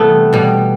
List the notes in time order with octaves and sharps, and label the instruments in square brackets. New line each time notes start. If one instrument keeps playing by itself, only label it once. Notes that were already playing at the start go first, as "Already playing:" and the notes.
Already playing: [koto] C3 E3 G3 A3 B3
B2 G3